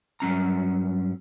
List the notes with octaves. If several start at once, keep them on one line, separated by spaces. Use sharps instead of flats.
G2 F#3 C#4 A#5